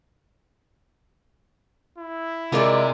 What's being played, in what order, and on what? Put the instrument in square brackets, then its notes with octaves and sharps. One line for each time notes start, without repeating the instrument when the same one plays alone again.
[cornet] E4
[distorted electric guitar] C3 [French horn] G#3 [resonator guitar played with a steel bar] F4 A#4 D5